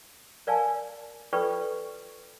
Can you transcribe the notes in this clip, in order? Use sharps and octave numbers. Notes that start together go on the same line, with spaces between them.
A#4 D5 F5 G#5 A5
F4 A4 B4 D5 G5 C#6